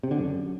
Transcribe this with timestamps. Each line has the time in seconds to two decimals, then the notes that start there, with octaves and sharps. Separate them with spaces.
0.03 C3
0.11 D3
0.18 F#2